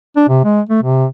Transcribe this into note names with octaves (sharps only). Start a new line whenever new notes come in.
D4
C3
G#3
A3
C3